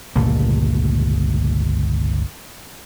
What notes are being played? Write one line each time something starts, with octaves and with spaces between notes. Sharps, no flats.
G1 C#2 A#2 A3